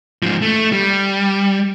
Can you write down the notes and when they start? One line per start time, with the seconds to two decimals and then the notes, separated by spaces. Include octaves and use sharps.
0.23 G#2 F3
0.42 A3
0.72 G3